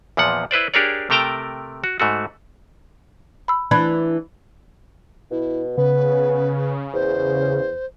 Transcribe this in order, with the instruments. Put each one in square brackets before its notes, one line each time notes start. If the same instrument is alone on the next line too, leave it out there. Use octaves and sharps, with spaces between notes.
[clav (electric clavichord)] E2 A#2 F3 F#5
E4 B4 C5 D5
D4 G4 G#4 A#4 C#5 D5
C3 A3 A#4 G5 A5 A#5
F#4
G#2 A3 F#4
[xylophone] B5 E6
[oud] E3 D4 E4 [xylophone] B5 G#6
[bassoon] B2 [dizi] E4
[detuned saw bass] C#3 [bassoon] B3 [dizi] B4
[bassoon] E2 [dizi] C5